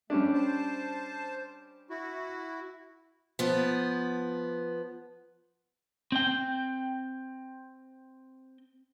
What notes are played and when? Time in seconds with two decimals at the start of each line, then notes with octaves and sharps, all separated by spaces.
0.10 G3 A3 C#4 D4
0.34 C5 A5
1.90 E4 F#4
3.39 F3 B3
6.12 C4 G5